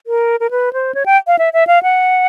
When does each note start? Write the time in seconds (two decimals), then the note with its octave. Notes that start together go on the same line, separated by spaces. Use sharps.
0.07 A#4
0.40 A#4
0.51 B4
0.73 C5
0.95 C#5
1.06 G5
1.27 F5
1.39 E5
1.53 E5
1.67 F5
1.83 F#5